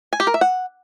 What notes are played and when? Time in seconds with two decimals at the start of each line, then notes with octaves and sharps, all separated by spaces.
0.13 G#5
0.20 G4
0.27 A#4
0.34 E5
0.41 F#5